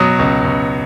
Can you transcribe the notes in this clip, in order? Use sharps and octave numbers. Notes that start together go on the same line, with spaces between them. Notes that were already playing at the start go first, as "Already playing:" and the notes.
Already playing: B2 F#3 D#6
C#2
C#2